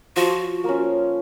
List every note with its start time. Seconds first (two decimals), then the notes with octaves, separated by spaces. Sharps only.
0.16 F3 F#4
0.64 A#3 C#4